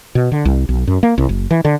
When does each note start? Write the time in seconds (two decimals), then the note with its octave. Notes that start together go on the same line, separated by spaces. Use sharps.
0.15 B2
0.32 D3
0.45 C2
0.69 B1
0.87 F#2
1.03 A#3
1.18 C2
1.29 F#1
1.51 E3
1.65 D3